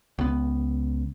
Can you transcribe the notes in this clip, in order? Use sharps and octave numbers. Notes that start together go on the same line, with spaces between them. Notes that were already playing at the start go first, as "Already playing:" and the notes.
C#2 B3